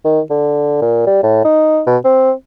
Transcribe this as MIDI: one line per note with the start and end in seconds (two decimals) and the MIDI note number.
0.05 0.20 51
0.30 0.81 50
0.82 1.03 46
1.07 1.22 55
1.23 1.45 45
1.45 1.81 63
1.87 1.97 47
2.04 2.32 60